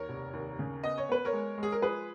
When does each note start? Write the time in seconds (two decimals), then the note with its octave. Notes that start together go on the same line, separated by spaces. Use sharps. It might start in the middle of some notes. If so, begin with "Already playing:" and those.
Already playing: D#2 A#4 C#5
0.09 F1
0.33 D#2
0.59 C#3
0.83 B3 D#5
0.98 C#5
1.09 B3 B4
1.25 A#4 C#5
1.33 G#3
1.58 G#3
1.63 G#4
1.72 A#4
1.82 F3 G#4 B4